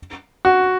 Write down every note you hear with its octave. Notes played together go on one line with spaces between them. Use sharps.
F#4